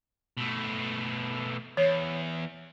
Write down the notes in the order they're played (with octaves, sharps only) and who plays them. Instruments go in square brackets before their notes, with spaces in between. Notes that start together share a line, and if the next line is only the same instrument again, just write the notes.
[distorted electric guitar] B2 A3
[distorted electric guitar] E2 [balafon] C#5